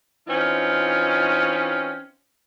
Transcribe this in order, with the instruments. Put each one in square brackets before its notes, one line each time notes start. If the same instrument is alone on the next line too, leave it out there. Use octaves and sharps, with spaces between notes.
[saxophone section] E3 C4 C#4 D#4 F4